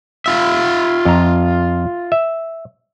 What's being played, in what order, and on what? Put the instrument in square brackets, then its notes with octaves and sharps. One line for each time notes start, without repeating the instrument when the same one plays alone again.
[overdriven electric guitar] F4 E5
[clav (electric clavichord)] F2 A#5
E5